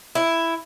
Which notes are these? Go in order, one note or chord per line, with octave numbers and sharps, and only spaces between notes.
E4